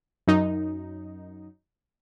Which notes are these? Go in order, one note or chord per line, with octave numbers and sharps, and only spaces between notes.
F#2 D#4